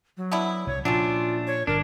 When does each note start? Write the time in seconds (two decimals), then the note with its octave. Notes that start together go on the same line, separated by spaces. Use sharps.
0.17 F#3
0.32 B3 D4 E4
0.67 C2 C#5
0.85 A#2 F3 F#3 A3 C#4 D4 F4
1.47 C#5
1.67 G1 D4 A#4